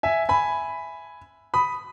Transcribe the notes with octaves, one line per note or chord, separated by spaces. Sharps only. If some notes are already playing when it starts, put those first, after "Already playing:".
E5 G#5
G#5 B5
B5 D#6